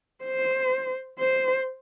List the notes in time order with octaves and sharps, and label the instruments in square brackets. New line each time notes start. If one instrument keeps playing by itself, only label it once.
[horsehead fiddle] C5
C5